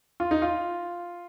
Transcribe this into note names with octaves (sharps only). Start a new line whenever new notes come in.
F4
D#4
F4